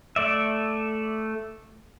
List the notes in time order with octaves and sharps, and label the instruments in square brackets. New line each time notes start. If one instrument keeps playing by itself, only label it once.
[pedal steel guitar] A3 D5 E5